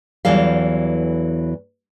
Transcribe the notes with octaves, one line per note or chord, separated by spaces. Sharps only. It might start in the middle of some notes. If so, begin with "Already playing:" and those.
E2 E3 F#3 G3 A4 F5